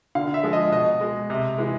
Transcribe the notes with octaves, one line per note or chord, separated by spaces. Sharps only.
D3 F5
E5
F3 G#3
D#5
B2 D#5
G#3
C3
E3 G#3